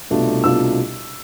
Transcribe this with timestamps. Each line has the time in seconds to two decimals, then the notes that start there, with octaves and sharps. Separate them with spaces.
0.10 C2 B2 A3 D4 F4
0.44 C2 B2 A3 D4 F4 E6